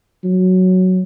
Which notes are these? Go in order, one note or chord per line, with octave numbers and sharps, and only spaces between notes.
F#3